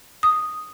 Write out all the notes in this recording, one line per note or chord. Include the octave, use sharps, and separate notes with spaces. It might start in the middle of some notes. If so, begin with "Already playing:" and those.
D#6